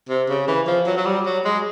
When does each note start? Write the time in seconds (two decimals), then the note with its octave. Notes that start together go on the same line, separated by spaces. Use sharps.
0.09 C3
0.29 C#3
0.48 E3
0.67 F3
0.86 F#3
0.97 F#3
1.06 G3
1.26 F#3
1.45 G#3